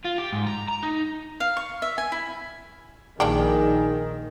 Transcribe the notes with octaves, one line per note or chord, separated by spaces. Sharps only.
F4
G4
G#2
A#5
A#5
D#4
F5
C#6
E5
G#5
E4
A#1 D#3 A#3 D4 G4 G#4